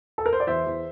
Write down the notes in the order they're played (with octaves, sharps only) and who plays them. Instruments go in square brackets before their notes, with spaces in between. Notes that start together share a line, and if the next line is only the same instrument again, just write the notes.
[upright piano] A4
A#4
C5
D5
E2 C5 E5
E2